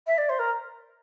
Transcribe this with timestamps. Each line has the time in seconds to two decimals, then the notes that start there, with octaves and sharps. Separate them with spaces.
0.06 E5
0.17 D5
0.29 C5
0.39 A#4